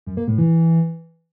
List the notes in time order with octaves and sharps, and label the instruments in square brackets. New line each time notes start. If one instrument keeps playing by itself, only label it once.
[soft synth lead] F#2
A#3
A2
E3